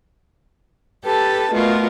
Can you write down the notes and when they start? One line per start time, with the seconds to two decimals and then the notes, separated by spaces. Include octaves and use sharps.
1.03 G4 A4 B4 A5
1.52 B2 A3 F4 A#4